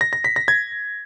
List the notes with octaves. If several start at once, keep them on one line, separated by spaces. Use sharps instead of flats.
A#6
A#6
B6
A#6
G#6